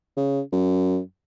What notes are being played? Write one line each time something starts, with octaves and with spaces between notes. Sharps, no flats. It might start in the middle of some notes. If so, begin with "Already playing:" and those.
C#3
F#2